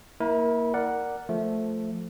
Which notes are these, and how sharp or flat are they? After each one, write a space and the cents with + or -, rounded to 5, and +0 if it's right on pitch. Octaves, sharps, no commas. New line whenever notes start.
A#3 +0 E4 -25 A#4 +20
A#4 +0 D5 +0 F#5 +0
F3 +0 A3 +0 E5 +0